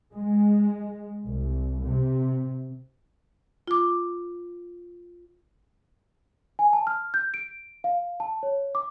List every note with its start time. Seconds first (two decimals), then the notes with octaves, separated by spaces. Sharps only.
0.13 G#3
1.26 C2
1.83 C3
3.68 F4 D6
6.59 G#5
6.73 A5
6.87 F6
7.14 G6
7.34 D7
7.84 F5
8.20 A5
8.43 C#5
8.75 D6